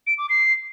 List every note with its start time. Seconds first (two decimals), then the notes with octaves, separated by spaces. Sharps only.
0.07 D7
0.18 D6
0.30 C7